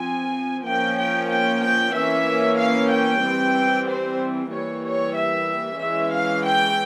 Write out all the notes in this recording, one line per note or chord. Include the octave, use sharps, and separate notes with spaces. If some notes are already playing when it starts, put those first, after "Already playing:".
Already playing: F3 C4 G#5
F3 A#3 C#4 G5
G5
G5
G5
E3 A#3 C#4 E5
F5
G5
E3 G3 C4
C5
E3 G3 A#3 C#5
C#5
E5
E3 G#3 C#4 E5
F5
G5